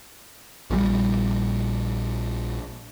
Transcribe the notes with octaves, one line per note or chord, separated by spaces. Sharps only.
A#1 A#2 E3 G3